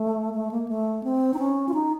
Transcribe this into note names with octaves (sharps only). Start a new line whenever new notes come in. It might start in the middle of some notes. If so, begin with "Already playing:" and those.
Already playing: A3
A3
A#3
A3
C4
D#4
C#4
F4
D#4